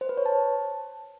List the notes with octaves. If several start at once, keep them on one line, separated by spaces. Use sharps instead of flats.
C5
B4
C#5
A5